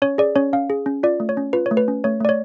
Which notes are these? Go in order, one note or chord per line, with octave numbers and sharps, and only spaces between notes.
C#4 C#5
G#4 D5
C#4 C#5
C#4 F5
G#4
C#4
F4 D5
A3
C#5
C#4
F4 B4
C#5
A3
B4
C#4
A3 C#5
A3 D5
C#5